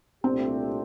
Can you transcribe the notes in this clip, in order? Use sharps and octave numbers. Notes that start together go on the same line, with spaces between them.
C2 A#2 A3 C4 D4 G4